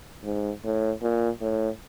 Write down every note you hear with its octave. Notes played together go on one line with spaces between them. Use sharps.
G#2
A2
A#2
A2